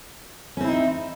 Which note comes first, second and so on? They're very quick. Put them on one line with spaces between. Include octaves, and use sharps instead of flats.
C#4 C4 E4 D#4